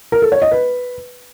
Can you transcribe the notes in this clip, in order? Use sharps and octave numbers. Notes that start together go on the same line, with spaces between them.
A#4
A4
C#5
D#5
B4